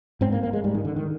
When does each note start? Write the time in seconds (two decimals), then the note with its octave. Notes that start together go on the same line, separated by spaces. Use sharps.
0.21 G#2 C4
0.32 A#3
0.43 A#3
0.53 G#3
0.64 G#2 G3
0.74 D#3
0.85 D3
0.96 D#3